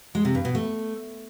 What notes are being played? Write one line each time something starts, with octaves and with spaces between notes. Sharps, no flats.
G#3
C3
G2
B2
A3